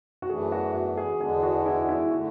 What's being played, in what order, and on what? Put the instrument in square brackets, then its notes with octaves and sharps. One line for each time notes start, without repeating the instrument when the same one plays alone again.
[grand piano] F#4
[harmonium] F#2 E3 A3 D4 [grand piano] G#4
[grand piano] F#4
F#4
G#4
[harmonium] E2 D3 G#3 B3 D4 [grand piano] G#4
[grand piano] F#4
E4
E4
[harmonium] D3 A3 [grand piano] F#4